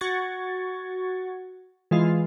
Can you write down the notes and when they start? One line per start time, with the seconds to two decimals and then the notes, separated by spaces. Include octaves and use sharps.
0.01 F#4 C#6 G#6 A6
1.91 E3 G#3 F4